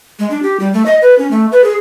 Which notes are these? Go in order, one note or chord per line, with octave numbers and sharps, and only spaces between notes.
G#3
D4
G4
G3
A3
D#5
B4
C#4
A3
B4
G#4